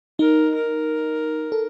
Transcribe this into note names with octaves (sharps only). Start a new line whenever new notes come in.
D#4 A#4
A#4
A4